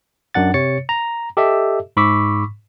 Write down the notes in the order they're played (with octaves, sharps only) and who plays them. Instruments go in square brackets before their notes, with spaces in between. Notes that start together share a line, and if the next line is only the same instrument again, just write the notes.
[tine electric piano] F#2 D4 F#5 A6
C3 C#5 A6 C#7
A#5
G4 A4 D#5 E5
G#2 B5 C#6 D6 E6 B6